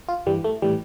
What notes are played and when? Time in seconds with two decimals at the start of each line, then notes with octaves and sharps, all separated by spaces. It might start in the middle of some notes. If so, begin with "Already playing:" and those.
0.09 F4
0.26 G2 E3 G3
0.44 A3
0.62 A2 E3 G3